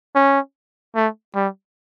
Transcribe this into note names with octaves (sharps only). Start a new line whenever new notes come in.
C#4
A3
G3